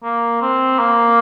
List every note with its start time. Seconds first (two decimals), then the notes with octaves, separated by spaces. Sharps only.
0.04 A#3
0.42 C4
0.79 A#3